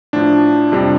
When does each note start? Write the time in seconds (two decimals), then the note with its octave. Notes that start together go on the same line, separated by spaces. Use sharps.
0.13 A2 F3 D4
0.72 F2 C3 G3 D4